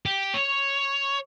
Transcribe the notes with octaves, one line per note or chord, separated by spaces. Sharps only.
G4
C#5